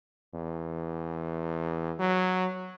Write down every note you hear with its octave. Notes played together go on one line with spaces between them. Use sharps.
E2
F#3